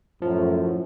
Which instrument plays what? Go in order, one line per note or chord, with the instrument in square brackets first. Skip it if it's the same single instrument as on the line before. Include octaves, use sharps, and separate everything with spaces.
[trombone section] F#2 A2 [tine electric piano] F3